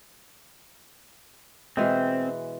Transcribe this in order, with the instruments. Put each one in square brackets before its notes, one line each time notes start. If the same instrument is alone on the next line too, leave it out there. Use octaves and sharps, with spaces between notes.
[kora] B2 E3 G#3 [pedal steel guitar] C4